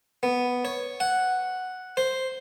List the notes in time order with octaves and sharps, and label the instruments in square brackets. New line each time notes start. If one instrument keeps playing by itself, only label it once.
[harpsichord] B3
C#5
F#5
C5